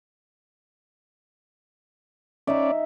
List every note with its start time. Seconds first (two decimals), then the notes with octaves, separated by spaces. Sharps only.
2.47 C#4 D#4 D5 E5